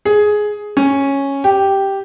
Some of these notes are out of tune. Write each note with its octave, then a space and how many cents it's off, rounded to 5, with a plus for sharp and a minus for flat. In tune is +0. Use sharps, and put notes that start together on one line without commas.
G#4 +10
C#4 -5
G4 -5